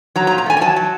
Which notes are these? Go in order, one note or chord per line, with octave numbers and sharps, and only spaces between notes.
F#3 A#5
A#5
A#2
A#5
A3 G#5
G#5
F#3 A5
F#3